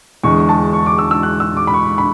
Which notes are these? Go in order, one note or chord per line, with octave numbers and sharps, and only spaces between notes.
E2 D3 G#3 C#6
A5
C#6
D6
E6
E6
F#6
E6
D6
B5
C#6
B5